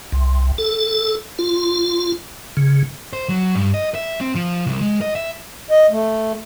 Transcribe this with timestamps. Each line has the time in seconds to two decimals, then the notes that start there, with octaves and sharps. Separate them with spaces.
0.12 C2
0.58 A4
1.39 F4
2.57 C#3
3.13 C5
3.29 F#3
3.55 G2
3.74 D#5
3.95 E5
4.21 C4
4.35 F3
4.66 C2
4.81 G#3
5.01 D#5
5.15 E5
5.70 D#5
5.91 A3